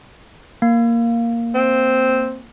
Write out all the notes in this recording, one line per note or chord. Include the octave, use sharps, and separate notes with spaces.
A#3
C4